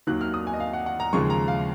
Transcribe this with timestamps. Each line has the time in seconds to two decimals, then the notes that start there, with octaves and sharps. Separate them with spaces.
0.07 D#2 D#3 F#3 A#3 F#6
0.21 F6
0.34 D#6
0.47 G#5
0.54 D#5
0.60 F5
0.73 F#5
0.86 F#5
1.00 A#5
1.13 D#2 C#3 F3 G#3 C#6
1.30 A#5
1.48 F5